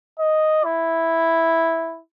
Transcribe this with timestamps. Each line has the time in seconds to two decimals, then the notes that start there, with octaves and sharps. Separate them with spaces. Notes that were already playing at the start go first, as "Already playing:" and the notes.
0.19 D#5
0.64 E4